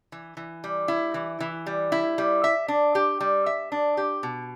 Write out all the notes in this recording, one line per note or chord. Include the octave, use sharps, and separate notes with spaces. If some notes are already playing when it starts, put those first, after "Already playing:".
E3
E3
G3
E4
E3
E3
G3
E4
G3
E5
D4
G4
G3
E5
D4
G4
B2